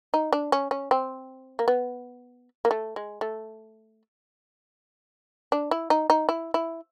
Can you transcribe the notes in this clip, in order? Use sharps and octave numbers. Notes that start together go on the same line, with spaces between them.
D#4
D4
C#4
C#4
C4
A#3
B3
A#3
A3
G#3
A3
D4
E4
D#4
D#4
E4
E4